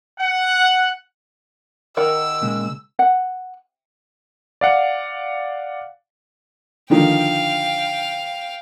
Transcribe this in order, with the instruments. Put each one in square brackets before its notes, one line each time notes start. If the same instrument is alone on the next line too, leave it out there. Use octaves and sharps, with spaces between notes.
[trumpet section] F#5
[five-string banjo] D#3 A#4 F#5 [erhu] E6
[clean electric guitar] A#2 C#3 G#3
[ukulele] F#5
[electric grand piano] D5 F5 F#5
[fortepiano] D3 D#3 F3 [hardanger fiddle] F5 G5